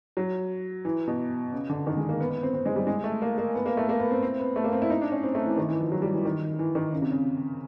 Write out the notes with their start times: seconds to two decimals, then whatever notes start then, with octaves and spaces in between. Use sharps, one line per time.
0.17 F#3
0.85 E3
1.07 B2
1.52 C#3
1.70 D3
1.87 D#3
1.97 G#3
2.09 A#3
2.20 B3
2.31 B3
2.43 C4
2.54 C4
2.66 G#3
2.76 G3
2.87 G#3
3.04 A3
3.22 A#3
3.38 A#3
3.55 B3
3.66 A#3
3.77 A3
3.89 A#3
4.00 B3
4.11 C4
4.23 C4
4.39 B3
4.56 A3
4.64 A#3
4.72 C4
4.82 E4
4.90 D#4
5.01 D4
5.12 C#4
5.23 C4
5.35 A3
5.46 E3
5.57 D#3
5.68 E3
5.81 F3
5.92 F#3
6.02 G3
6.14 E3
6.25 D#3
6.59 E3
6.75 D#3
6.93 C#3
7.02 C3
7.11 C#3